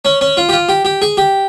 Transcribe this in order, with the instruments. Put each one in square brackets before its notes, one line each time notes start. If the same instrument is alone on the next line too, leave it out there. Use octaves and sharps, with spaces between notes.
[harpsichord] C#4
C#4
F4
G4
F4
G4
G4
G#4
G4